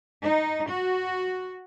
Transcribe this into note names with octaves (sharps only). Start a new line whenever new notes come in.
D#4
F#4